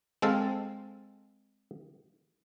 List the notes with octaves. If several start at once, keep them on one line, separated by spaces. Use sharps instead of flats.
G#3 C4 A4 F5